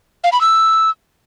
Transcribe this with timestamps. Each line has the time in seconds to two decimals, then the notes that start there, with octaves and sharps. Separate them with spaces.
0.24 F5
0.32 B5
0.41 E6